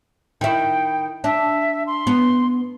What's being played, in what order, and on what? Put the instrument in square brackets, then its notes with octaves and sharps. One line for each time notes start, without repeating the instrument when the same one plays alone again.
[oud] D#3 E4 [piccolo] G5
[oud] D4 [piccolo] E5
[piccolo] C6
[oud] B3